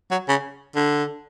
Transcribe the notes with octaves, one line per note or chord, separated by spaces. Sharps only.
F#3
C#3
D3